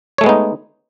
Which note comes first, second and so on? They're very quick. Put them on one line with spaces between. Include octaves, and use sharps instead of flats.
C#5 A3 G#3 B3 D#4